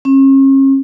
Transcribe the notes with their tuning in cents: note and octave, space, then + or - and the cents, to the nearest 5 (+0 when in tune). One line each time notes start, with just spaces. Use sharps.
C#4 -40